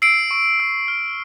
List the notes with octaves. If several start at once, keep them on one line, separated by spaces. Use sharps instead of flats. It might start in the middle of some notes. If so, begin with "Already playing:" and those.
E6 C7 D7
C#6
E6
F6